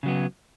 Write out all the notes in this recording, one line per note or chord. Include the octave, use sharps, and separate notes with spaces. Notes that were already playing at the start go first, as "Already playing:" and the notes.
C#3 F#3 B3